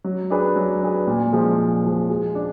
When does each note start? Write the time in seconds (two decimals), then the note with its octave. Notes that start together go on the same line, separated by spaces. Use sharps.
0.04 F#3
0.30 D4 G#4 B4
0.56 F#3
0.82 D4 G#4 B4
1.07 A#2
1.33 F3 G#3
1.59 A#2
1.84 F3 G#3
2.10 G#3
2.35 D4